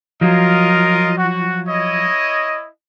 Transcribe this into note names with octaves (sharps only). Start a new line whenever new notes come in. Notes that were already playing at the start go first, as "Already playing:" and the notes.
F3 F#3 F4 A#4 D#5
F#4
E4 C#5 D#5